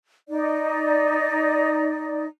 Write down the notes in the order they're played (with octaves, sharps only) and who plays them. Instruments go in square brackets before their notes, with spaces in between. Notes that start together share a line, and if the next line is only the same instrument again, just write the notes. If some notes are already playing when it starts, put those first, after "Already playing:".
[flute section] D#4 D5